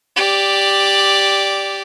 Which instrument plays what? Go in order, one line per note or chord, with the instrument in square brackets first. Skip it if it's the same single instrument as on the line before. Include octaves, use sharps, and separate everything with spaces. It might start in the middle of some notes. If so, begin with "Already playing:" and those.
[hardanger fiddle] G4 D5